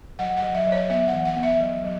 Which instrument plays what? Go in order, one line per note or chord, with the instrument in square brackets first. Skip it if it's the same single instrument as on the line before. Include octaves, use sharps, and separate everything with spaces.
[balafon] F#3 F#5
F#5
F#3
E5
F#3
C#5
B3 E5
F#5
E3
F#5
B3
E5
F#3
F#3